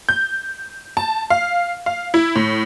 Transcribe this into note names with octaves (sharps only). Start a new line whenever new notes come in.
G6
A5
F5
F5
E4
A2